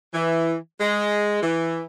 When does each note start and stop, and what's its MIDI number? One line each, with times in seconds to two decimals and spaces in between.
0.14 0.56 52
0.81 1.41 56
1.42 1.83 52